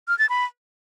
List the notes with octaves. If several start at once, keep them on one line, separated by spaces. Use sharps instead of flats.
F6
A6
B5